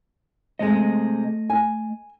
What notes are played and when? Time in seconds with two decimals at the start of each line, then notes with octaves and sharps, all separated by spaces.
0.59 C3 G#3 A3 D#5
1.50 G#5